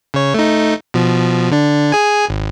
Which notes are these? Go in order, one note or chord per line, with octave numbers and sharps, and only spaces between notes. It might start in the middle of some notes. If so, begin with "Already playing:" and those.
C#3 C#5
A3 D#4
B2 F3
D3 D4
G#4 G#5
G#1